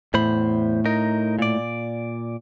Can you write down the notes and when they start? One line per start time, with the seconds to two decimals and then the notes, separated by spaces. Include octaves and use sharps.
0.14 E2 A2 C5 B5
0.86 D#4 A#4
1.39 A#2 D5